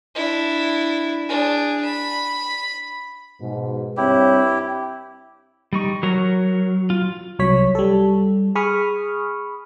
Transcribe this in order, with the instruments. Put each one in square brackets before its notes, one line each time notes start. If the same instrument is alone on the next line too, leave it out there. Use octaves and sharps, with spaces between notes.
[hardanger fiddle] D4 E4
D4 G#4
B5
[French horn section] G#2 B2
[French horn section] G2 C4 C#5 [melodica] E4 G4
[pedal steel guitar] G3 D#4 C#6
[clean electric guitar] F#3 [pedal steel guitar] A#4 C#5 A#5
[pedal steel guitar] F4
[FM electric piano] C2 F#3 C#5 B6
G3 A4
G#4 B5 C#6 D#6 F6